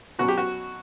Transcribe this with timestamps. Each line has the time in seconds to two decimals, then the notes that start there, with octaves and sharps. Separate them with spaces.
0.19 B2 F#3 C#4 F#4
0.28 G4
0.38 F#4